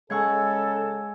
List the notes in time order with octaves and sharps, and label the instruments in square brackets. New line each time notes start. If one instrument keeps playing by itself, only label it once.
[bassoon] C#3 [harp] G#3 F#5 C#6 [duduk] A4 [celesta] G#5 E6 G#6